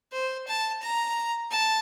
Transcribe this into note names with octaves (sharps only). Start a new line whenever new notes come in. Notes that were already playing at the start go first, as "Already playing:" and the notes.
C5
A5
A#5
A5